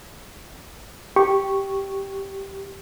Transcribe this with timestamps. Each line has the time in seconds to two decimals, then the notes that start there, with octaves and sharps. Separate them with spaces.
1.16 G4 C#6